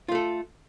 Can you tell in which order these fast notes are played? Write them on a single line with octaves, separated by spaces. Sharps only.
F4 A3 A4